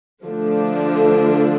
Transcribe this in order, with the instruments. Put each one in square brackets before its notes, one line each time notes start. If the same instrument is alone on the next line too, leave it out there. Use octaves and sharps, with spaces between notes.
[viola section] D3 F3 A3 D4